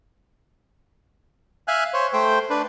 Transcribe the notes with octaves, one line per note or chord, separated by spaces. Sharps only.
E5 F5 G#5 F#6
C5 C#5
A3 C5 G5
D4 B4